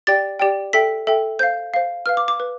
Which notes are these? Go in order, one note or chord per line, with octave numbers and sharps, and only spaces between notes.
G4 D5 G5 A6
G4 D5 G5
A4 E5 G5 B6
A4 E5 G5
C5 F5 G6
C5 F5
B4 F5 F6
D6
D6
B4